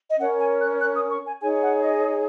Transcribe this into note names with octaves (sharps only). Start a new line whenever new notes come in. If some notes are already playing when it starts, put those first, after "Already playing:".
D#5
C#4 A#4 C#5 F#5
G#5
F#6
F#6
D#6
C#6
G#5
D#4 G#4 C#5 G#5
F#5
D#5